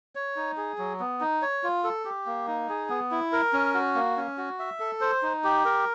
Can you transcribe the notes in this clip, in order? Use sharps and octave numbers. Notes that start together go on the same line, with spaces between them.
C#5
D#4
G#4
F#3
B3
D#4
C#5
F4
A4
G4
A#3
D#4
G#4
B3
E4
A#4
C#4
F#4
A#3
C#4
F#4
E5
A4
C5
D#4
G4
A#4